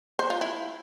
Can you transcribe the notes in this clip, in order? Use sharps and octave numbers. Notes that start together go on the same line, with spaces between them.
C5
F4
E4